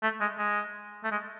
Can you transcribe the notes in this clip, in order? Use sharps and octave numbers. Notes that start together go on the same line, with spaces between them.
A3
G#3
G#3
A3
G#3